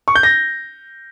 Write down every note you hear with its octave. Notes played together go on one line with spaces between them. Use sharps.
C#6
G6
A#6